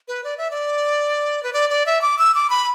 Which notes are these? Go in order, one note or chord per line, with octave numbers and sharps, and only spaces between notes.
B4
D5
E5
D5
B4
D5
D5
E5
D6
E6
D6
B5